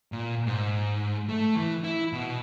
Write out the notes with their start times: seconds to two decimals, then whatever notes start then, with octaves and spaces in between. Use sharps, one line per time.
0.12 A#2
0.47 G#2
1.29 A3
1.56 E3
1.84 E4
2.13 B2